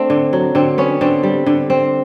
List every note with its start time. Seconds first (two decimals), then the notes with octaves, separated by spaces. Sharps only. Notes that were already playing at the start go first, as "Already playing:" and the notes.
Already playing: A3 C4 D4
0.10 D3
0.33 F#3
0.55 D3 C4
0.78 B3 C#4
1.01 D3 C4
1.23 G3
1.46 D3
1.70 C4